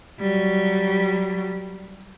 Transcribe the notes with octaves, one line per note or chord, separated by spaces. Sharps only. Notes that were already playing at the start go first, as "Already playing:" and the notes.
F#3 G3